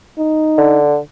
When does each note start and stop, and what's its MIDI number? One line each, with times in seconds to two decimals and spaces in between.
0.18 0.79 63
0.58 0.98 50